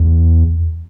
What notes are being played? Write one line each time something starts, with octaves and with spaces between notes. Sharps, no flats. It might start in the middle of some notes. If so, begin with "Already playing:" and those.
Already playing: E2